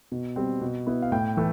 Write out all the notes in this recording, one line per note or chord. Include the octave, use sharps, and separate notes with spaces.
B2
G3 C4
B2
B3 E4
F5
A2 G5
E3 A3